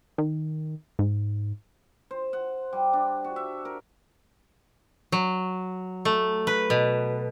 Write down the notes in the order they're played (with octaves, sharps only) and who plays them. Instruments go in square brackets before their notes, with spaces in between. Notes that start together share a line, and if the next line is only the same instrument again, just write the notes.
[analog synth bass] D#3
G#2
[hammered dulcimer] C5
F#5
G3
D4
F#4
E5
A#4
[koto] F#3
A3
B4
B2